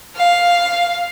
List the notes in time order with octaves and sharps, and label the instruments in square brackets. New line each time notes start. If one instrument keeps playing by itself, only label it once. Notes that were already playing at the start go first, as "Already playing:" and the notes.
[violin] F5